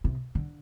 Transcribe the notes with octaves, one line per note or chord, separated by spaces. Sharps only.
C3
D3